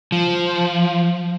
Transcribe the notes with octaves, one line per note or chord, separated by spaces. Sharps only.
F3